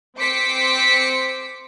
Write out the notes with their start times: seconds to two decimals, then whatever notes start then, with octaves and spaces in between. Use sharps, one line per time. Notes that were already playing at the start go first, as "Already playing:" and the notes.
0.17 C4 C5 D6 B6 C#7